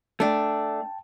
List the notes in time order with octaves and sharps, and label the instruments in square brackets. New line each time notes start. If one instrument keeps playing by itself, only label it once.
[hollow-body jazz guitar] A3 D4 [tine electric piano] G5 A5